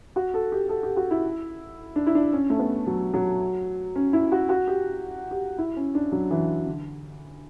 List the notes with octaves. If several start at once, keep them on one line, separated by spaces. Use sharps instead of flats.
F#4
A4
G4
A4
G4
F#4
E4
D4
E4
D4
C#4
A3
B3
F#3
F#3
C#4
E4
F#4
F#4
G4
G4
E4
C#4
D4
F#3
E3
D3